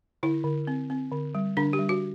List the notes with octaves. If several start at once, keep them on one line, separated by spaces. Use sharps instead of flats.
D3 E4
D3
C4
C4
D3
G3
D3 D4
G4
G3
F#4